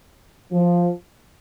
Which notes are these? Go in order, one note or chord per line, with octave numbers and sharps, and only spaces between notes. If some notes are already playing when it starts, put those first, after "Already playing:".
F3